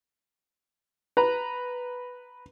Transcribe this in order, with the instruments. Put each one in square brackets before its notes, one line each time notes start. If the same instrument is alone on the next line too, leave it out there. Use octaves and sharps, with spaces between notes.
[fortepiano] B4 A#5